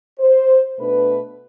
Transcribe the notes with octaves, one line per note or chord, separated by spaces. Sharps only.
C5
B2 A3 D4 B4